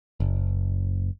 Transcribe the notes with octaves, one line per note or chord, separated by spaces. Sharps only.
F#1